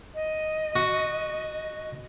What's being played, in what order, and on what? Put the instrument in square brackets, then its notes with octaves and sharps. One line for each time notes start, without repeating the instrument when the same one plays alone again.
[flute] D#5
[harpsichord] F#4